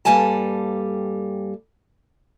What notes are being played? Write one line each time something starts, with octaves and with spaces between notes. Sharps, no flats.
G2 G3 A#3 A4 G#5 A5